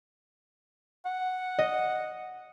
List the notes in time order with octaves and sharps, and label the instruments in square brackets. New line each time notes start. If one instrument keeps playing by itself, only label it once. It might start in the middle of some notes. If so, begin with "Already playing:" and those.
[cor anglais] F#5
[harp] D#5